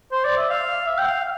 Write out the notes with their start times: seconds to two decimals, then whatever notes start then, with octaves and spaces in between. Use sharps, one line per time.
0.12 C5
0.25 D5
0.38 E5
0.50 F5
0.87 E5
0.98 G5
1.06 F5